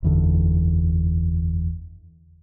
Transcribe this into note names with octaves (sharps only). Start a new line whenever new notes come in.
F#1 E2 D3